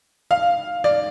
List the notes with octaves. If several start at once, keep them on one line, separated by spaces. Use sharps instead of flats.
F5
D5